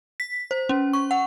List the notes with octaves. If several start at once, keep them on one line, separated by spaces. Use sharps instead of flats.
B6
C5
C#4
C#6
F#5